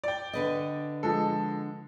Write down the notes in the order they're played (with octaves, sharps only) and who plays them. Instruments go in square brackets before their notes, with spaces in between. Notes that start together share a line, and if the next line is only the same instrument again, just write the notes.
[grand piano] D5 G5
[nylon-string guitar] D3 B4 D#5
[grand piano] F3 G#3 A4